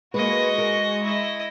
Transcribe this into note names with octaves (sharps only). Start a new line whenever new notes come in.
G#3 A#3 F#4 B4 D#5 C#6
A#4
E4 D#5